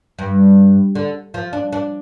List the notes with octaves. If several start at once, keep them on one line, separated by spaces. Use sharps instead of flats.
G2
D3
F3
D4
D4